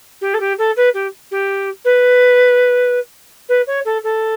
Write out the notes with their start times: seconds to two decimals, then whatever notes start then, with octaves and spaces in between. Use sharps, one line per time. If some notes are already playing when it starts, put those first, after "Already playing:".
0.21 G4
0.34 A4
0.40 G4
0.58 A4
0.76 B4
0.94 G4
1.31 G4
1.84 B4
3.48 B4
3.67 C#5
3.85 A4
4.03 A4